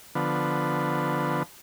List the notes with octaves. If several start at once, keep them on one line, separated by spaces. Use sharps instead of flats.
D3 F3 B3